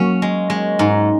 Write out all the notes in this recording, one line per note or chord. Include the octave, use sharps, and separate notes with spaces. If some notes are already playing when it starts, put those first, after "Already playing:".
Already playing: F#3 A#3 C#4
G#3
G#3
G#2